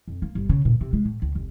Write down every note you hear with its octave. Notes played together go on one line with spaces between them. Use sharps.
F2
A#3
G1
C#3
A#2
C3
G#3
A2
C#2
F1